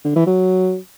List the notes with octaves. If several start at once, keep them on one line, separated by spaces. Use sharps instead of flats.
D3
E3
F#3